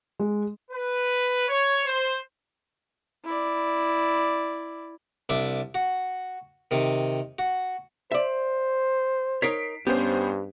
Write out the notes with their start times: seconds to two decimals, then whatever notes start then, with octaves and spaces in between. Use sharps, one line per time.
0.19 G#3
0.71 B4
1.48 C#5
1.86 C5
3.25 E4 D5
5.29 C2 D4 E5 D6
5.75 F#4
6.71 C3 D#3
7.39 F#4
8.12 C5 D5 E5
9.42 D#4 A#4 C#5 B6 C7 D7
9.87 G2 B3 C#4 G4 C5